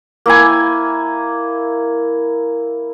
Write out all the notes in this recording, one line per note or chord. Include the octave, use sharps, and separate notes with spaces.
A#3 E4 G#5